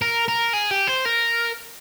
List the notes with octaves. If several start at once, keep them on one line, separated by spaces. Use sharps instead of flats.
A#4
A#4
G#4
G4
C5
A#4